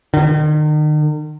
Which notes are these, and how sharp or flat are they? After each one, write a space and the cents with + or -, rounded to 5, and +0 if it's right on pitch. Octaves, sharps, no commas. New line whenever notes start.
D#3 -40